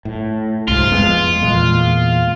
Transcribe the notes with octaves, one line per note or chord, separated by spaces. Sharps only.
A2
C2 G#2 G#3 F4
F2 G#3 B3
E2 A#2 G#3